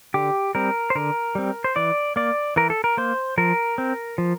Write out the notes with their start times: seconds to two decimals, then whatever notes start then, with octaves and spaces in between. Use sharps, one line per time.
0.14 D3 G4
0.55 G3 C4 A#4
0.90 C5
0.95 D3 A#4
1.35 G3 C4
1.64 C5
1.76 E3 D5
2.16 A#3 D5
2.56 E3 A#4
2.70 A4
2.84 A#4
2.97 A#3 C5
3.38 F3 A#4
3.78 C4
4.18 F3